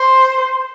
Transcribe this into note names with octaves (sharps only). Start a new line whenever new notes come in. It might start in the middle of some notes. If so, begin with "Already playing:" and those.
Already playing: C5